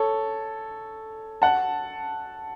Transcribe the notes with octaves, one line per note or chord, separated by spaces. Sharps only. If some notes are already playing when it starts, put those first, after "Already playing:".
Already playing: A4 C#5
F#5 A5